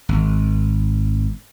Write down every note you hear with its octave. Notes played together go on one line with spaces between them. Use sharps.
G#1